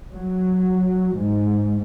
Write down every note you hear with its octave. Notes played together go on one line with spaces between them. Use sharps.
F#3
G#2